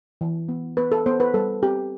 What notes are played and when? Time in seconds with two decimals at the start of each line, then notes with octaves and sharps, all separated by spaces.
0.21 E3
0.49 B3
0.77 B3 B4
0.92 A4
1.06 B3 C5
1.20 B4
1.34 G3 A4
1.63 C4 G4